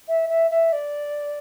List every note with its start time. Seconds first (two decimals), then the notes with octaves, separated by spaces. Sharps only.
0.08 E5
0.29 E5
0.51 E5
0.73 D5